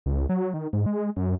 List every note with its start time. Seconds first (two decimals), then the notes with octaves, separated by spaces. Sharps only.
0.06 C#2
0.29 F#3
0.54 D#3
0.73 G#2
0.86 G#3
1.16 F#2